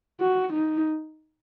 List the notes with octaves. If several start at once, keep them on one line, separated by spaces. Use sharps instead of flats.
F#4
D#4